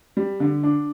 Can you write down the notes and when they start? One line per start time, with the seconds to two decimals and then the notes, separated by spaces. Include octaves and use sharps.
0.17 G3
0.40 D3
0.63 D4